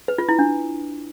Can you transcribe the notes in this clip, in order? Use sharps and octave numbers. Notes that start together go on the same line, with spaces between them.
B4
F4
E4
D4